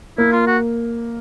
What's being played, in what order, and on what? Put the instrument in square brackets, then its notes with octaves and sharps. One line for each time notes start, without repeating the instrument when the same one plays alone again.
[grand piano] A#3 [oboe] E4
[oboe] F4
F#4